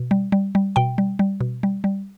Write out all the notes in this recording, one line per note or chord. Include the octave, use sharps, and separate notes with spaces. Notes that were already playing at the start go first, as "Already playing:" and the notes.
Already playing: B2
G3
G3
G3
B2 G5
G3
G3
B2
G3
G3